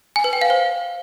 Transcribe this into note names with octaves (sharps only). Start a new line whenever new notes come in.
G#5
B4
G5
F5
C5